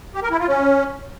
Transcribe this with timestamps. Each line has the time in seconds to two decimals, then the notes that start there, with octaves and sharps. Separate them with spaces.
0.15 G4
0.23 A#4
0.31 E4
0.40 F4
0.48 C#4